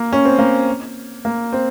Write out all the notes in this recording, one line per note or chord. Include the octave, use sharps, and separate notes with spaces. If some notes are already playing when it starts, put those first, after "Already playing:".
Already playing: A#3
C#4
C4
A#3
A#3
C4